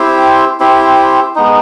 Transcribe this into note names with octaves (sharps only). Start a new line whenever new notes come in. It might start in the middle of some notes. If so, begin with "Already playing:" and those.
Already playing: C4 E4 G4 C5
C4 E4 G4 C5
G#3 B3 D#4